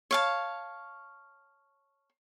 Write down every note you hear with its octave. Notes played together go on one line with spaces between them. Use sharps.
C#5 F5 A5